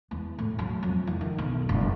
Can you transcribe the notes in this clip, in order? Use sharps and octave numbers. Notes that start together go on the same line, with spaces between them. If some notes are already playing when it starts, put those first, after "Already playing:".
E2
A2
F#3
F2
E3
D#3
B1
F#1